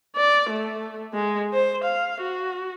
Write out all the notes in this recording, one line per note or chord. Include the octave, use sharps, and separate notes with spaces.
D5
A3
G#3
C5
F5
F#4